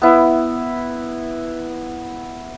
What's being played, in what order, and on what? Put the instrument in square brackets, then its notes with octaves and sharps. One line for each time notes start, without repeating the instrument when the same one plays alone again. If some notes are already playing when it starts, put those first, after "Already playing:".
[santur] B3 E4